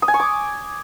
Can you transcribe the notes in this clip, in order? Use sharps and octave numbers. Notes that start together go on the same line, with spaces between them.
D#6
G#5
C#6
D6